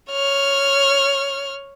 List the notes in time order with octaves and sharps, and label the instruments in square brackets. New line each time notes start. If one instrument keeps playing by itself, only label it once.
[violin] C#5 F6